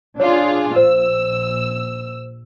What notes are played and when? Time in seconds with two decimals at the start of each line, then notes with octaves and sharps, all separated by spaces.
0.20 D4 F4 G#4 C#5
0.76 A#1 C5 E6